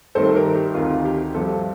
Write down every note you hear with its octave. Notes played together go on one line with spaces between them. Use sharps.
G2 D#3 A3 A4 C5
G4 A#4
G4
D2 C3 D#3 F4
G4
G2 F3 A3 F4 A4